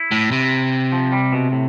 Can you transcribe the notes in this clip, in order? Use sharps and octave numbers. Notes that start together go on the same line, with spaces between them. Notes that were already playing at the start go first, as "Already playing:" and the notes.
Already playing: E4
A2
C3
F3
G3
B2
A2